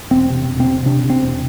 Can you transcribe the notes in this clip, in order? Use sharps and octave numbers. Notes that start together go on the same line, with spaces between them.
E1 C4
C3
E1
C4
C3
C3 D4
C3
C4
E1